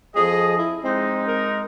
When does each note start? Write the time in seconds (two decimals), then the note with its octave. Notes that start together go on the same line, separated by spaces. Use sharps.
0.16 F2 F3 G#4 D#5
0.58 E4
0.83 G#3 C4 D#4
1.27 A#4